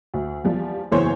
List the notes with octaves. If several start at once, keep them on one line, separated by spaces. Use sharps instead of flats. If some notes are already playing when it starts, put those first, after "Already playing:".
D2
E2 F3 G3
F#1 E2 E3 C5 C#5